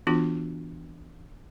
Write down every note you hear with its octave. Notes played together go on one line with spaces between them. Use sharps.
E3 B3 D4 F4 F#4